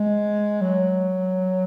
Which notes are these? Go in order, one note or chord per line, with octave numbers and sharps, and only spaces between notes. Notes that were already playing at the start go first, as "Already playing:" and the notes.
Already playing: G#3
F#3